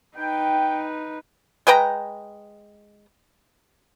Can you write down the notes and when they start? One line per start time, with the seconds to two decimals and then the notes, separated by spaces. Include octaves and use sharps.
0.17 D#4 B4 G5
1.67 G#3 B4 G5 A#5